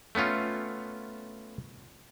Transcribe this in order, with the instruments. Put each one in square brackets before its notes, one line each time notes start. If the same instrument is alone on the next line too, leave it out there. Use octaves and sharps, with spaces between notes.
[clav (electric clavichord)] A3 B3 C#4 F4